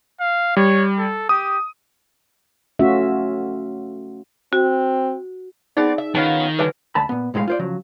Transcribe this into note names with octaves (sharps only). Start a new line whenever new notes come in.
F5
G3 C#5
A4
G4 D#6
A3 C#4 F4 F#4 E5
C4 F#4
B3 C4 D#4 G#4 D5
E5
D#3 B3 C#4 F4 G#5
D3 F#3 G3 B4 E5 G#5
D2 A5 B5
A#2 B3
B1 A2 G#3 B4 F5
F4 C5 D5
C#3 F3 F#3